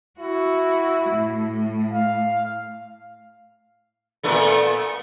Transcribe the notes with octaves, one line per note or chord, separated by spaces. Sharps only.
E4 F#4
A2
F5
A#2 A3 B3